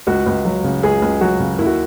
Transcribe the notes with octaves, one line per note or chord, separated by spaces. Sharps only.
C#2 F#4
C#2
F#3
C#3
C#2 G#4
C#2
F#3 F#4
C#3
D#2 E4
F#4